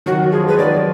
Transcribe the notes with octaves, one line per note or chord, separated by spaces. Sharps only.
D#3 F#3 F#4
F3 G#3 G#4
B4
D#3 F#3 D5